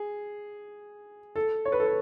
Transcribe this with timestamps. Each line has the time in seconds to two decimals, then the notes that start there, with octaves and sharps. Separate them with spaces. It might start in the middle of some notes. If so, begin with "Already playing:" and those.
Already playing: G#4
1.36 A4
1.65 C#5
1.72 B4
1.80 A4
1.87 B4